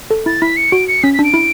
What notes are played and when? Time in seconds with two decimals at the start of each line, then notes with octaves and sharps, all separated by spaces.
0.11 A4
0.26 E4 A6
0.42 E4 B6
0.57 C#7
0.72 F#4 D7
0.88 C#7
1.03 C#4 B6
1.14 B6
1.19 D4
1.24 D7
1.34 E4